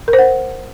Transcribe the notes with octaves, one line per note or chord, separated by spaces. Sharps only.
A#4
C5
F#5